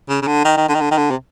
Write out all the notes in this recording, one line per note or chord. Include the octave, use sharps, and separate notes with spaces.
C#3
C#3
D3
D#3
D#3
D3
D#3
D3
D#3
D3
C3